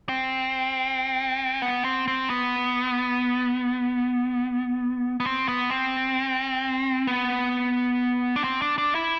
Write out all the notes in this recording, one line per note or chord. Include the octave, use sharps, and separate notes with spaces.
C4
B3
C4
C4
B3
B3
C4
B3
C4
B3
D4
C4
D4
D4
E4